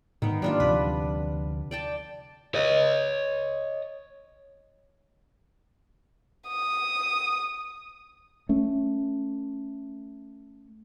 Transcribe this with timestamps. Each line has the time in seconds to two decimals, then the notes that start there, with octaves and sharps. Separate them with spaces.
0.22 G#2 D#3 B3
0.42 F#3 G3 A#3 D4 F4
0.60 D2 C3 F3 B4
1.71 D5 G5 A5
2.55 C#5 D#5
6.48 D#6
8.49 A3 C#4